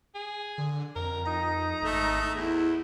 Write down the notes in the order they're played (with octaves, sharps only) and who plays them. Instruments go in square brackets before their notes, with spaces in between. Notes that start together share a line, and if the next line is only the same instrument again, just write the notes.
[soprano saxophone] G#4
[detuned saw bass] D3
[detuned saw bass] F2 [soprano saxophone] A#4
[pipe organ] D#4 [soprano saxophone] A#5
[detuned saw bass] G#1 [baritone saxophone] A3
[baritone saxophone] E2 [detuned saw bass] E4